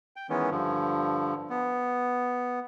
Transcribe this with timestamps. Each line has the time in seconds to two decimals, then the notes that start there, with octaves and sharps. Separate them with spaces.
0.16 G5
0.30 D#3 E3 G#3 B3 C#4
0.50 G2 D3 F3
1.50 B3